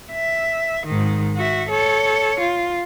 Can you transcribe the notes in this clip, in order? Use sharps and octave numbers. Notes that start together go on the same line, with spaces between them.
E5
G#2 D#3
F#4 E5
A4 C#5
F4